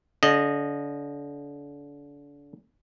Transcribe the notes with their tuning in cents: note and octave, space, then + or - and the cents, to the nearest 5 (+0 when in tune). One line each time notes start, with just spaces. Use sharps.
D3 -35 D#5 -15